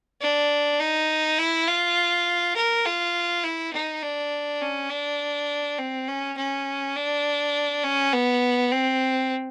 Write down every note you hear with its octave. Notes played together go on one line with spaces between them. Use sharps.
D4
D#4
E4
F4
A#4
F4
E4
D#4
D4
C#4
D4
C4
C#4
C#4
D4
C#4
B3
C4